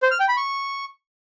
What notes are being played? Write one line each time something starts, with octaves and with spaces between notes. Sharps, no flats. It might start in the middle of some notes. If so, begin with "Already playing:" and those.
C5
F6
G5
B5
C#6